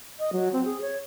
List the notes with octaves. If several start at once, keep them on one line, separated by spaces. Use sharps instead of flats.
D#5
F#3
C4
G#4
C#5